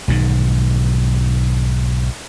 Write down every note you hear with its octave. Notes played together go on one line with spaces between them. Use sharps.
B1 G#2 D#3